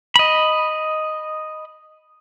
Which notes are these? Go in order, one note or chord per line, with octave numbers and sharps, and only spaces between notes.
D#5 B5